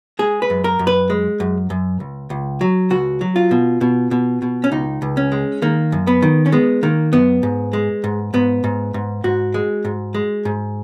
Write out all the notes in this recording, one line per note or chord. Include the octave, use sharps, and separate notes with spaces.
G#3 G#4
B4
F#2
A#4
F#2
B4
G#3
F#2
F#2
C#2
C#2
F#3
C#2 F#4
F#3
F4
B2
B2
B2
B2
C#4
C#2 D#4
C#2
C#4
G#3
D#3 A#3
F#2
B3
D#3
C#4
G#3 B3
D#3 A#3
F#2 B3
G#2
G#3
G#2
G#2 B3
G#2
G#2
G#2 F#4
G#3
G#2
G#3
G#2